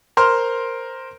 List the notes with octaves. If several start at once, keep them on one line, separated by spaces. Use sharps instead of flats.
A#4 C5 C6 F6